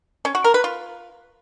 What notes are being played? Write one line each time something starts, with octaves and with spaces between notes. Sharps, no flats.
C#4
F#4
A#4
B4
F4